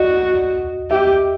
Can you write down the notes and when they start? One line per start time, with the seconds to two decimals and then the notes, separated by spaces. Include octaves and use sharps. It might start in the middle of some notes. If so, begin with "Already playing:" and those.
Already playing: F#4 D5 D#5
0.90 G4 E5